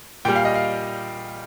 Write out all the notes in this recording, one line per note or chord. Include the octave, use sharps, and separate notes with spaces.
A#2 G3 G5
F5
D#5
F5